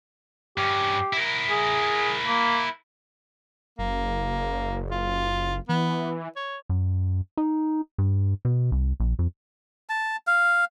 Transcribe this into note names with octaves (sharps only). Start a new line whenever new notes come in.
G2 C#4 G4
E4 A#4
G#4
A#3
F#1 A#3
F4
E3 B3
C#5
F#2
D#4
G2
B2
C2
A#1
F2
A5
F5